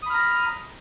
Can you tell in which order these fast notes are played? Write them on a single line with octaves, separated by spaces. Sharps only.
D#6 B5 F6 A#5